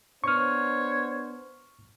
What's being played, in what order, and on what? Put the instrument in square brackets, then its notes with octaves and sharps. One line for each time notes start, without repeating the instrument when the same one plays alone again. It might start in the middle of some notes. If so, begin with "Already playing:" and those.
[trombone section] B3 D4 C5 [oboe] C#5 [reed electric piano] C#6 F6